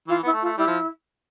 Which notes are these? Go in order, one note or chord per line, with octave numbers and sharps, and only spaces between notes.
E3 F4
B3 E4
A3
F4
A3
G3 E4
F3